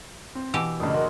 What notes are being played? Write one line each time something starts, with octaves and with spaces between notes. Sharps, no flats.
C4
B2 E3 G4 E6
F#2 A2 C#3 D4 D#5
G#3 A#3 F#4 A#4